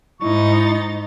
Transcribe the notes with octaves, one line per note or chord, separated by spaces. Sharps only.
G#2 D#4 E4 C#6 A6